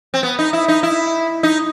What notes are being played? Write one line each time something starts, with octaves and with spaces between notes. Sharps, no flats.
C4
B3
D#4
E4
D#4
E4
D#4